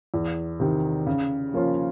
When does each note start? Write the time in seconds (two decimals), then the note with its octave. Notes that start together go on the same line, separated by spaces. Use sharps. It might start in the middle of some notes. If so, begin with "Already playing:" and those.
0.14 E2
0.60 C3 D#3
1.07 C#3
1.54 F3 A#3 C#4 F4